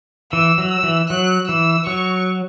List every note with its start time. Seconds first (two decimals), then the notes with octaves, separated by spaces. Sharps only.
0.32 E3 E6
0.58 F#3
0.71 E6
0.83 E3
1.10 F#3 F#6
1.48 E3 E6
1.86 F#3 C#6